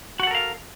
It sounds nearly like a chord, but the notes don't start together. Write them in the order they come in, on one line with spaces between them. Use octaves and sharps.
F#4 F#5 A4 A#4 F5